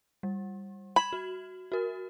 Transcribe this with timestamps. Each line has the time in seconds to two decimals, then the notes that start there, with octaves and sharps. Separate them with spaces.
0.23 G3
0.96 B5 G#6 E7 F#7
1.13 F#4
1.72 F#4 A#4